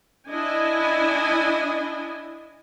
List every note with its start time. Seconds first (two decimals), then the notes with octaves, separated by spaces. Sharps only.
0.29 D4 E4 D#5 G#5